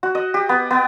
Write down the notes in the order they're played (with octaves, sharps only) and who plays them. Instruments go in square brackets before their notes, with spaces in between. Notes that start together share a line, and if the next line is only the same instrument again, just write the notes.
[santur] F#4
D#5
G4
B3
B3